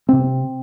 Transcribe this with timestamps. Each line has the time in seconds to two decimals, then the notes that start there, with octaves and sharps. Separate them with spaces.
0.09 C3 C4